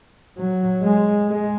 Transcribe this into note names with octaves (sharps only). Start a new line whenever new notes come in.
F#3
G#3
G#3